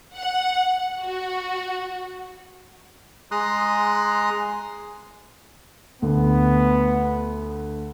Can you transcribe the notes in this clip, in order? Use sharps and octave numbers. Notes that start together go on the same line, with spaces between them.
F#5
F#4
G#3 A#5 C6 D#6 F#6
D2 B3